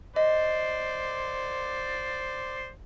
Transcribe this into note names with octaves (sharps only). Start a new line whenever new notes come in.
C5 D5 D#5